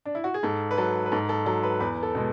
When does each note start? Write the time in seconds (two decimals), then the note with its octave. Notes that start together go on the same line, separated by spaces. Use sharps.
0.06 D4
0.15 E4
0.24 F#4
0.34 G#4
0.43 G#2 A4
0.71 B4
0.78 F#3 A4
1.06 B4
1.12 G#2 A4
1.29 A4
1.46 F#3 A4
1.63 B4
1.80 E2 B4
2.03 A4
2.15 B2 G#3